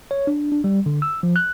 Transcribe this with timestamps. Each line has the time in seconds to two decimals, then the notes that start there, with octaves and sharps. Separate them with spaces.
0.11 C#5
0.27 D4
0.52 D4
0.64 G3
0.86 D3
1.02 E6
1.23 F3
1.36 F#6